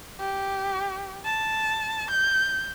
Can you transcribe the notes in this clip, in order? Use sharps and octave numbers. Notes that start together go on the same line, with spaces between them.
G4
A5
G6